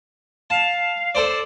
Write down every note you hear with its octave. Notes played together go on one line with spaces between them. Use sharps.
F5 A5
A4 C5 D5